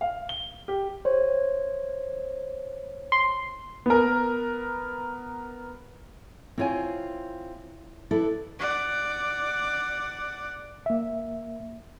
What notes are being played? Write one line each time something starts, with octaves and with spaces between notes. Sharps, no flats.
F5
G7
G4
C5 C#5
C6
B3 A#4
C4 E4 F4 C#5 G#5
E4 A4 B4 D5
D5 F#5
A#3 E5